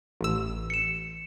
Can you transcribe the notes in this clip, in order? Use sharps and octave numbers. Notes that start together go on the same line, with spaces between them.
A1 E6
C#7 E7